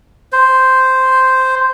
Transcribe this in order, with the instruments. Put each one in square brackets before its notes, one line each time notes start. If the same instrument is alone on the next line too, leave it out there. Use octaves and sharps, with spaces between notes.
[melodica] C5